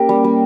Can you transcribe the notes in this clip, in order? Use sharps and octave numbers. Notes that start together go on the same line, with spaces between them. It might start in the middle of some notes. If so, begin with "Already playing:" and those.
Already playing: A#3 C#4 G4 A#4
G3
G3